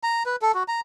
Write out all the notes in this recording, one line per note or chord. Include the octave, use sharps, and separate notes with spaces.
A#5
B4
A4
F#4
A#5